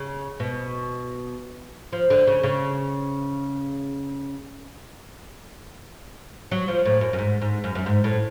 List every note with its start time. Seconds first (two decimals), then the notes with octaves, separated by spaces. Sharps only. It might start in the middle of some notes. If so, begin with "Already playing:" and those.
Already playing: C#3
0.40 B2
1.92 F3
2.10 D3
2.27 C#3
2.43 C#3
6.51 F#3
6.68 F3
6.85 A2
7.01 F#2
7.13 F#2
7.19 G#2
7.41 G#2
7.64 F#2
7.75 F#2
7.86 G#2
8.04 A2